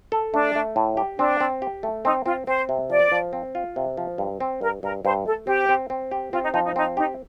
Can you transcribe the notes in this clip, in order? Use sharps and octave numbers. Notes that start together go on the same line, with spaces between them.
A4
A3 D4
A3
A2
G4
C4 D4
C4
G4
A3
C4 D#4
C4 F4
C4 C5
C3
F3 D5
F3
C4
F4
C3
F3
G2
C4
G2 A#4
G2 A#4
G2 C5
A3 A4
C4 G4
C4
C4
G4
C4 F4
D#4
F3 D#4
D#4
C4 D#4
D#4 G4